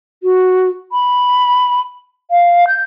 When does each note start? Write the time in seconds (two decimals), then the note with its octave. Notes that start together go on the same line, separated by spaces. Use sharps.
0.23 F#4
0.92 B5
2.31 F5
2.68 G6